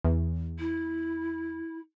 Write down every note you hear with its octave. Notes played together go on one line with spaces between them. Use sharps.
E2
E4